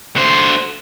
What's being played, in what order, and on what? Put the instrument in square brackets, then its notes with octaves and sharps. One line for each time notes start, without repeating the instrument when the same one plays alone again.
[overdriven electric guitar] D3 C5